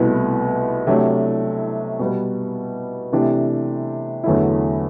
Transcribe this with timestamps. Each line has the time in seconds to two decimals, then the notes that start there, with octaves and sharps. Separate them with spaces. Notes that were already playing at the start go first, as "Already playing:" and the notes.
Already playing: C2 B2 A3 E4 B4
0.87 C3 F#3 A3 D4 G4
1.99 B2 G3 B3
3.12 C3 E3 A3 D4 G4
4.24 E2 D3 F#3 A3 E4